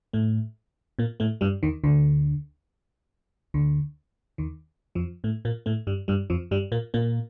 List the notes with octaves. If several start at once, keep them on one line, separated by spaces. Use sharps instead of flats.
A2 A3
A#2 A#3
A2 A3
G2 G3
D#2 D#3
D2 D3
D2 D3
D#2 D#3
F2 F3
A2 A3
A#2 A#3
A2 A3
G2 G3
G2 G3
F2 F3
G2 G3
A#2 A#3
A#2 A#3